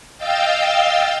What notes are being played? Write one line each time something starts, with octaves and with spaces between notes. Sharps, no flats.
D#5 F5 G5 E6 G6 A6